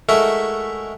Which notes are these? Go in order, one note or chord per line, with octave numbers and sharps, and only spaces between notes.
G#3 A3 E4 F#4 A4 A#4